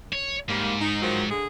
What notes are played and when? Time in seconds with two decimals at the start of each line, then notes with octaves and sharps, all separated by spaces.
0.13 C#5
0.49 G#2 G3 A#3
0.81 D#4
1.01 D#3 F3 F#3
1.31 D3 G#4